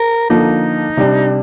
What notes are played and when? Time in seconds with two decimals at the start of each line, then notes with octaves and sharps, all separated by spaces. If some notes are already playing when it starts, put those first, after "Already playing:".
Already playing: A#4
0.30 D3 F3 A#3 D#4
0.97 C3 G3 D4